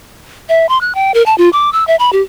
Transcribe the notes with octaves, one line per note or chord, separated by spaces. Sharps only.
E5
C6
F#6
G5
A#4
A5
F4
D6
E6
E5
B5
G4